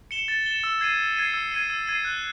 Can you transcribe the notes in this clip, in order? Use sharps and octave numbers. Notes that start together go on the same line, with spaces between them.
C#7 E7 G7
A6
C#7 E7 G7
E6
G#6 C7 D#7
E6
G#6 C7 D#7
E6
G#6 C7 D#7
E6
G#6 C7 D#7
F#6